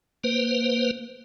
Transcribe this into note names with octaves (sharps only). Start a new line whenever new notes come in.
A#3 B4 C5